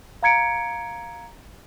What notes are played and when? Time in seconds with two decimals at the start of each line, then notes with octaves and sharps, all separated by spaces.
0.23 F5 A#5 G#6 C#7 D7